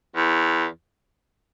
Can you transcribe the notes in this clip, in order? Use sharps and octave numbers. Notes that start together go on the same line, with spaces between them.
E2